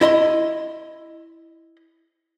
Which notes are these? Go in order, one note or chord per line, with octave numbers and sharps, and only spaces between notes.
E4 D#5 B5 C6